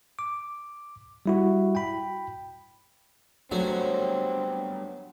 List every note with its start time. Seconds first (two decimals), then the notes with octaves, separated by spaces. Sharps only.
0.19 D6
1.26 G3 E4 F#4
1.75 G5 B5
3.51 F#3 G3 A3 B3 C4 D4 F#4